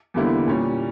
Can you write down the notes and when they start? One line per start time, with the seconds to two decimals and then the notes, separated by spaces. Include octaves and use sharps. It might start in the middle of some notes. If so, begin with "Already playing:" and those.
0.14 E2 D3 G3 A#3 E4
0.47 A#2 G3 C#4